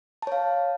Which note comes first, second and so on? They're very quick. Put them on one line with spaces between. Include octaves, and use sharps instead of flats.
A5 C#5 F5